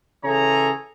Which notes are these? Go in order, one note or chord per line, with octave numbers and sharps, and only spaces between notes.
C#3 E3 G#4 A4 C#5 A#5